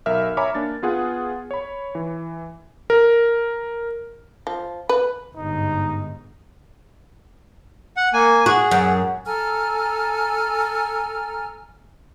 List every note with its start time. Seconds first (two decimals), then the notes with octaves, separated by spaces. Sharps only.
0.06 B1 A#4 E5 F6
0.37 C#5 E5 G#5 A#5 B5 D6
0.55 A#3 D4 A6
0.83 B3 F4 G#4 F#5
1.51 C#5 B5
1.95 E3
2.90 A#4
4.47 F3
4.89 B4
5.35 G1 G#2 D#4
7.97 F#5
8.13 A#3 G#5
8.46 F#4 G#4
8.71 F#2
9.26 A4 G#5 A#5 F6